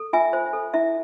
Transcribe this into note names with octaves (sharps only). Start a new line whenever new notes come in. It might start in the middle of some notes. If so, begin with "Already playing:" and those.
Already playing: A4
F4 E5 G#5
C5
A4
E4 E5